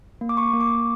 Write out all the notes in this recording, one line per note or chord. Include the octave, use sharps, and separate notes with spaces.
A#3
D6
C#6
A#3
D6